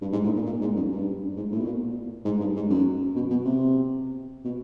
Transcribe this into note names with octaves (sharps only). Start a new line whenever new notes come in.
G2
G#2
A2
A#2
A#2
G#2
F#2
G2
G#2
A2
B2
A#2
G#2
G2
G#2
F#2
B2
B2
C3
B2